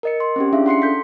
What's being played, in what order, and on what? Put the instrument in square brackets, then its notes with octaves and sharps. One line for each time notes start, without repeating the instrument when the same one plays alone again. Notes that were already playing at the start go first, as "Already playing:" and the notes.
[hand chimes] A#4 D#5 C#7
C6
C4 C#4 G4
C#4 D4 E4 G#4 E5 F5
F#5 C6 C7 C#7
A4 C6 G6 B6